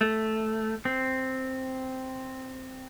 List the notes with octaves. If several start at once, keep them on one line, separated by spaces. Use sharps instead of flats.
A3
C4